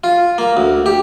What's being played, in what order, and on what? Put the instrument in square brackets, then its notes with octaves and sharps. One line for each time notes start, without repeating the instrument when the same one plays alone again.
[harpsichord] F4
A#3
D2
G4